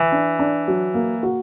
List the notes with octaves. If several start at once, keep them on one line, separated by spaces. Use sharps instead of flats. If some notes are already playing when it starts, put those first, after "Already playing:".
Already playing: E3
D4
D4
F#3
A#3
F#4